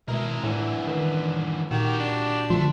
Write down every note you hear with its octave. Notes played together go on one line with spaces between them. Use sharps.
B2 G#3 E4 A#4
A2 D3 E3
D#3 B4
A#2 D#3 F#4 G4
D4
D3 F3 A3